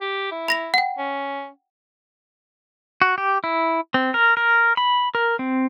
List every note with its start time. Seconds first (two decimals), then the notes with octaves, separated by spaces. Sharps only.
0.01 G4
0.31 E4
0.48 B5 A#6 F7
0.74 F#5 G5
0.98 C#4
3.02 F#4
3.18 G4
3.44 E4
3.94 C4
4.14 A#4
4.37 A#4
4.77 B5
5.15 A#4
5.39 C4